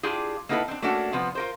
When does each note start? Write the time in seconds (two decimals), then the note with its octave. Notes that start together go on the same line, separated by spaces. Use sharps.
0.03 D4 E4 F4 G4 G#4
0.49 A#3 B3 D#4 E4 A4 B4
0.68 C4 D4
0.82 A3 A#3 C#4 D4 F#4 A4
1.13 C3 F3 B3
1.35 F4 A#4 C5